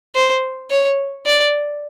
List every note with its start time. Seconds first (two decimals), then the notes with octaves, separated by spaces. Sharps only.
0.15 C5
0.70 C#5
1.26 D5